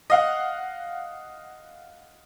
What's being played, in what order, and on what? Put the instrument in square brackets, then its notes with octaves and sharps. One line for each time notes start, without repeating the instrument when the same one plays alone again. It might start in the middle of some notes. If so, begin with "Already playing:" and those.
[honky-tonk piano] D#5 F5 F#5